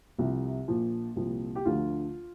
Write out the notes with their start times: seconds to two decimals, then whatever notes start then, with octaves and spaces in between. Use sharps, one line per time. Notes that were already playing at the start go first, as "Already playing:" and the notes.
0.19 C2 C3 F3
0.68 A#1 A#2 F3
1.16 C2 A#2 F3
1.55 G4
1.65 D2 D3 F3 F4